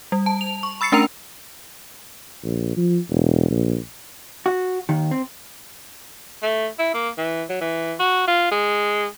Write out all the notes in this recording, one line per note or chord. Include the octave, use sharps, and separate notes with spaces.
G3
A5
F7
C#6
B5 E6 A6 C7 C#7
A3 C#4 D4 A#4 A#5 F7
A#1
F3
E1
A#1
F#4
D#2 D#3
C4
A3
E4
A#3
E3
F#3
E3
F#4
F4
G#3